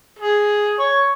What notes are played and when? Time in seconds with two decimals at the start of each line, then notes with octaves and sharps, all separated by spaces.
0.19 G#4
0.80 C#5